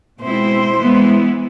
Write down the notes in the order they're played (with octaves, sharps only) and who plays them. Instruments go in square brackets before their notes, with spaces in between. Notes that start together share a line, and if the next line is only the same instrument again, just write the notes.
[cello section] B2 G#3 C4 E4 [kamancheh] C5
[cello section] E3 G#3 B3 E4